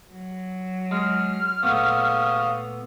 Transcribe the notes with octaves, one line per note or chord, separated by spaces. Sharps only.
F#3
G#3 F6
A#2 A3 B3 F5 C#6 D#6